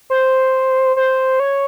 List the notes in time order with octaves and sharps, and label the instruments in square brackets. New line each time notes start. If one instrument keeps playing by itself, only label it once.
[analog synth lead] C5
C5
C#5